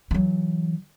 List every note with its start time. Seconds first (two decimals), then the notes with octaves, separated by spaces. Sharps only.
0.11 E3 F#3